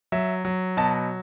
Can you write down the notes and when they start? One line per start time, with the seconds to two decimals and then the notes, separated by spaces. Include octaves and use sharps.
0.12 F#3 E5
0.45 F#3
0.77 B2 A5